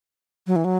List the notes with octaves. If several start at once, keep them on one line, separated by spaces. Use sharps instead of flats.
F#3
E3
F#3